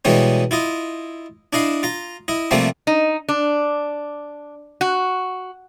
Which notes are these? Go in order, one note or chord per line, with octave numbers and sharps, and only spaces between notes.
B2 E3 G3 G#3 C#4
E4 F4 D#5
D4 E4 D#5 F5
F4 A#5
E4 D#5
C3 F3 G3 A3 A#3 C4
D#4
D4
F#4